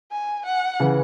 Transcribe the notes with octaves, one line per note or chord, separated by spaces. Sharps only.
G#5
F#5
C#3 E3